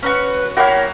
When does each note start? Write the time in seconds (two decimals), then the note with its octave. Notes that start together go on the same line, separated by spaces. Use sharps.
0.03 C#4 D#4 F#4 B4
0.57 A#3 E4 F#4 G4 C#5 F5